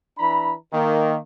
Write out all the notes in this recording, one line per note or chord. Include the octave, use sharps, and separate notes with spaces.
E3 D4 A#5 B5
D#3 A#3